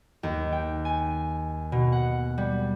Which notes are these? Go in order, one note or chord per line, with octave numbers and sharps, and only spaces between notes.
D#2
G5
G#5
B2
F#5
G3